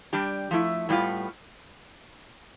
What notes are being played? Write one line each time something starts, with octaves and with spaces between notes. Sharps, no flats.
G3 D4 G4
F3 A3 E4
A2 G3 B3 F4